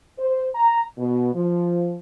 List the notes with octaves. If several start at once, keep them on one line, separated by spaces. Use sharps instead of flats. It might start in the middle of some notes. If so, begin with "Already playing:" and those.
C5
A#5
B2
F3